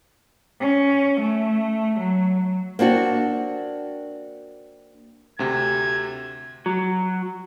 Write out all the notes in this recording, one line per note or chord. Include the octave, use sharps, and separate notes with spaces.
C#4
A3
F#3
A#3 C4 D4 F#4
D2 C3 G#6
F#3